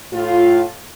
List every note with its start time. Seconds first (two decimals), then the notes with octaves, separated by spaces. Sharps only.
0.12 A2 F4